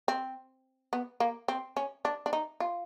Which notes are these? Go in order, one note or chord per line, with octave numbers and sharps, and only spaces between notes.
C4
B3
A#3
C4
C#4
D4
D4
D#4
F4